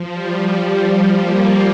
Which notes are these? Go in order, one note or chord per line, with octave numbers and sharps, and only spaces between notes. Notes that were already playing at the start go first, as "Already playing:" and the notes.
Already playing: F3
G3
G3
A#3